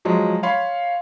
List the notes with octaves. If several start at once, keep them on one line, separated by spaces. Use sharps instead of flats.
F3 F#3 G#3
C#5 F5 B5 C6